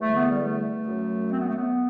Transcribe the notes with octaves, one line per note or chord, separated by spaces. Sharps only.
E2 D3 G3 A3
B3
G3
A3
F#2 F#3
C4
B3
A3
B3